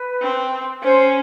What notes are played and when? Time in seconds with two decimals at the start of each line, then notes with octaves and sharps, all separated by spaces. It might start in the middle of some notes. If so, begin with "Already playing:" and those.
Already playing: B4
0.21 C4
0.82 C#4 C5